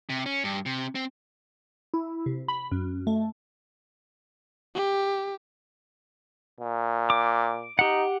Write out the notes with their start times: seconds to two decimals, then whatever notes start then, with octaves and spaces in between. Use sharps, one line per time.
0.10 C3
0.26 C#4
0.44 G2
0.66 C3
0.95 C4
1.94 E4
2.26 C3
2.48 B5
2.71 F#2
3.07 A3
4.75 G4
6.60 A#2
7.10 D6
7.79 D#4 G4 F#5